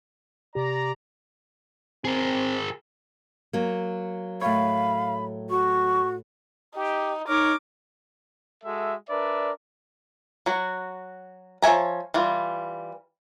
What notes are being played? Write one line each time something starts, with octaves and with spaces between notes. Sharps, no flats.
C3 G4 D5 A#5
C4 G#4 A#4
F#3 A#3
A2 C#5 F5 B5
F#4 C#6
D#4 G4
D#4 A#4 C#5 D6
G#3 F#4 A4 E5
D4 A#4 B4 D5 E5
F#3 F#4
F3 C#5 E5 G#5 A#5
E3 G3 F4